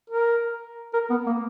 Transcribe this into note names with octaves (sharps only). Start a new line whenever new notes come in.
A#4
A#4
B3
A#3